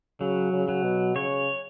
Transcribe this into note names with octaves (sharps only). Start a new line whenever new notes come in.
C#3 F#3
C#3
F#3
B2
C#3 C#5